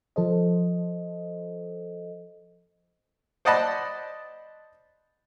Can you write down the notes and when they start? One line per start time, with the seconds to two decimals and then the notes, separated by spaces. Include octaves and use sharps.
0.16 F3 A4 C5 D#5
3.45 C5 D5 D#5 F#5 A5 B5